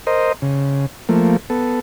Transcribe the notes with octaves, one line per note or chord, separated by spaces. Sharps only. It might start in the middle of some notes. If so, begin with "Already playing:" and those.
A#4 C5 D#5
C#3
F3 A3 A#3
B3 A4